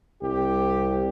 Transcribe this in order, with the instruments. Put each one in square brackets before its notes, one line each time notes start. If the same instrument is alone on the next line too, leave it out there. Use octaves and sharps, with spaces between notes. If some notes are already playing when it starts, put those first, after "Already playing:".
[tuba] C2 [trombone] G4